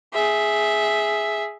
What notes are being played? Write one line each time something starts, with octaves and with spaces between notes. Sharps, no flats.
G#4 E5